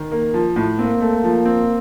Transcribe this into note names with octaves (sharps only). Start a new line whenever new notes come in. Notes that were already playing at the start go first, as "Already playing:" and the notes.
Already playing: D#3
A#3
F3
A2
A#3 C4
A3
F3
C4